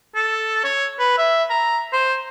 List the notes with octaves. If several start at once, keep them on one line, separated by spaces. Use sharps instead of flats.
A4
C#5
B4
E5
A#5
C5